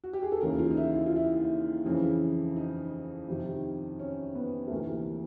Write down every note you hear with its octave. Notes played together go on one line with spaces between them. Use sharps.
F#4
G4
G#4
A4
D#2 C#3 E3 A#4
F4
D#4
E4
E4
F4
E4
F2 C#3 E3
D#4
F2 C3 D#3
C#4
B3
A3
D2 C3 E3 A#3